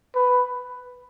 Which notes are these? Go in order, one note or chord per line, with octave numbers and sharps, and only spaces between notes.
B4